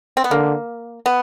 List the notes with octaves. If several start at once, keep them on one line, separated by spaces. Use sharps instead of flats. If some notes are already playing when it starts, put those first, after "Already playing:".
C4
B3
D3 A#3
B3